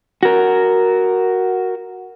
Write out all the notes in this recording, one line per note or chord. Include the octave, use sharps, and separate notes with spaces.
F#4 A#4